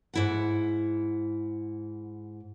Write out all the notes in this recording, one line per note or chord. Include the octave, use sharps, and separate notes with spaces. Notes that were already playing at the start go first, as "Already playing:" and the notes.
G#2 E4 F#5